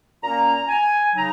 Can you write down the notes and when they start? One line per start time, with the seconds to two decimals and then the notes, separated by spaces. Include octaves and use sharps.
0.23 A#2 A#3 C#4 A#5
0.69 G#5
1.15 C#3 F#3 D#4 A#5